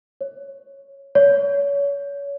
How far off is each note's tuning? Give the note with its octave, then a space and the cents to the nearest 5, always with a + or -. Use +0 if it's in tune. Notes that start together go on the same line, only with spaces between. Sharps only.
C#5 -10
C#5 +30